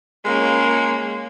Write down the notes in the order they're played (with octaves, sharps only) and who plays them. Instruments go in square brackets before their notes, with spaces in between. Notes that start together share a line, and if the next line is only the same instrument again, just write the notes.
[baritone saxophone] G#3 [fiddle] A#3 C#4